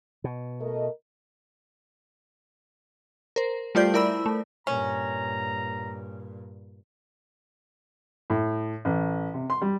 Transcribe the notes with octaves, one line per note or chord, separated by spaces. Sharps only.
B2
A3 A#4 D#5
A#4 C5
G3 A3 F4 C5 D5 G6
E4 A#4 D5 B5 E6
A3
G2 A#2 C#4 A#5
A2
A1
C3
C6
G3